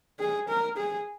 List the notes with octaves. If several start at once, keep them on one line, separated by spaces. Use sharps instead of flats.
G#4
A#4
G#4